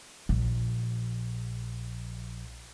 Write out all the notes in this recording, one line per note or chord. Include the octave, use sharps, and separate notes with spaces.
A#1 F3